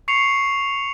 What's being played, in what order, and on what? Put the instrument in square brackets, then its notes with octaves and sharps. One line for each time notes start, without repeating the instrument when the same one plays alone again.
[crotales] C#6 C7 C#7 F7